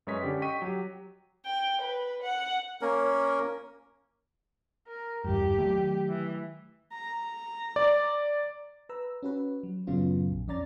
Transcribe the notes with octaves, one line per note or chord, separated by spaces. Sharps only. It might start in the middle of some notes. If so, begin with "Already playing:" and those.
F#2 G#3 B4 C#5 D#5 B6
D3 C#4 G4 D5
D#5 G5 C#6 B6 D#7
F#3 G4
G5
B4
F#5
A#3 C#4 A#4
A#4
G#1 E2 G2 G4
D#3 F#3 A3
E3
A#5
D5
B4 A#5 E6
C#4 F#4 B4
F#3
F#2 A2 C#3 F#3 B3 F4
A#1
F2 C#4 D5 A#5 A6